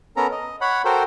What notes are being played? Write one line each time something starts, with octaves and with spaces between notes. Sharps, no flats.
B3 C#4 A4 A#4 A#5
D#5
C#5 F#5 B5
F#4 A4 A#4 C5 G5